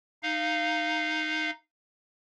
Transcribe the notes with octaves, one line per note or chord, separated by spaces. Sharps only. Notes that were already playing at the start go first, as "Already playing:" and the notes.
D#4 F5